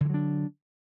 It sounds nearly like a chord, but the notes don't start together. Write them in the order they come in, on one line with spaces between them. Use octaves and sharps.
D3 E3 F#3 D4